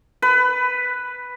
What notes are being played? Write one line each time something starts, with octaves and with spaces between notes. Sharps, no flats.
B4